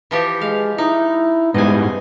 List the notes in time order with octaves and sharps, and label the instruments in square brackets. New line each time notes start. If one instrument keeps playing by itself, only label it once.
[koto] E3 F3 G4
[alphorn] G#3 [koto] F5
[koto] D#4 [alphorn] E4
[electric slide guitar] G#2 G3 G#3 [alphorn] B3 [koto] D#5 G#5